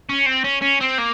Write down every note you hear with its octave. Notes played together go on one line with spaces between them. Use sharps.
C#4
C4
C#4
C#4
C4
A#3